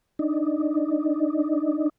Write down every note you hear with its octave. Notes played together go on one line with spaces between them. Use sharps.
D4 D#4